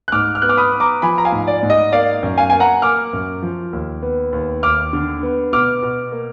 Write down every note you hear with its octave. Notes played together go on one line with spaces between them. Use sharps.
F#6
G#2 D6 F6
F6
B3 F#6
D6 F6
B5 D#6
B3
A#5 D6
F3 G#5 B5
A#5
F5 G#5
G#2
D5
G#2
D#5
A#3 D5 F5
F#2
F5 G#5
A#3 G#5
F#5 A#5
A#3 D6 F6
F#2
F3
D#2
B3
D#2
D#2 D6 F6
D3
B3
B2 D6 F6
B2
A#3